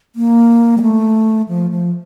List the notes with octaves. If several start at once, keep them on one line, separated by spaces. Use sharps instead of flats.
A#3
G3
A3
F3
F3